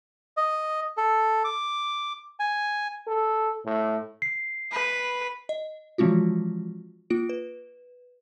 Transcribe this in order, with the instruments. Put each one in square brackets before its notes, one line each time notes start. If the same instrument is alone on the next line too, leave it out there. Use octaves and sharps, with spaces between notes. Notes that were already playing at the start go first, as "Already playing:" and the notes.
[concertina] D#5
A4
D6
G#5
[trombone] A4
A2
[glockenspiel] C7
[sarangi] B4
[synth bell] D#5
E3 F3 G#3 C4 F4 F#4
A#3 F4 D7
B4